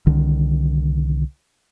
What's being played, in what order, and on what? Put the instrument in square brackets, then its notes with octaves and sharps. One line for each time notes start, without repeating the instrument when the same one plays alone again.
[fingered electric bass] C2 D3 D#3